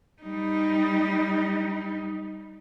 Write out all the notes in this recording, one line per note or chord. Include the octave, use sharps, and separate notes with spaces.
G3 D#4